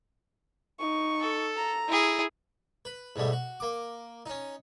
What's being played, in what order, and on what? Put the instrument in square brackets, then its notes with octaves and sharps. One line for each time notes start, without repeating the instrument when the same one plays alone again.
[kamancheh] D#4 C#6
[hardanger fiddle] A4
[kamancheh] A#5
[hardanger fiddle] E4 G#4
[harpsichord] B4
G#2 B2 G3 A3
F#4
A#3 D6
C#4 D#4